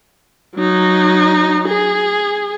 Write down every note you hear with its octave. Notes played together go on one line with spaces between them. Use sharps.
F#3 D#4
G#4